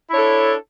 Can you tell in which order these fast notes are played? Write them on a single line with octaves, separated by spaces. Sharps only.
E4 D4 C#5 A4